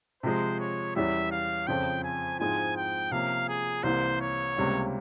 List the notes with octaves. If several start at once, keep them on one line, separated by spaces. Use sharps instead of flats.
C3 F3 G#3 C5
C#5
E2 E3 G3 C#4 E5
F5
F2 C#3 F3 C4 G5
G#5
G#2 F3 G#3 C4 E4 G#5
G5
C3 F3 A#3 C#4 F5
G#4
C2 C3 E3 A#3 C5
C#5
C#2 C3 G3 A#3 C#4